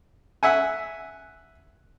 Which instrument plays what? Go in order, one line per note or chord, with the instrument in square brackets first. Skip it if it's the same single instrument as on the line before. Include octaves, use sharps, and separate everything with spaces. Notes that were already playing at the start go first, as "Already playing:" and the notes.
[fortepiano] E5 F#5 G#5